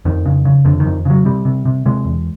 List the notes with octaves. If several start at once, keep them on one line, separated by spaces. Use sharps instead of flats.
F2 D#3
C#3
C#3
F2 D3
D#3
F2
C#3 F#3
C3 G3
C3
C3
C3 G#3
E2